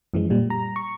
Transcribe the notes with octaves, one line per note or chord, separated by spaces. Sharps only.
F#2 E3 F3 G#3
A#2 G3
A#5
C#6